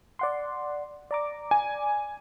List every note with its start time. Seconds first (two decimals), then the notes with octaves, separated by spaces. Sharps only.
0.19 D5 F#5 C6
1.11 D5 A#5 D6
1.51 G#5